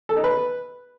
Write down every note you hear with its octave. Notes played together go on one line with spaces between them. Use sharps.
A4
D#4
B4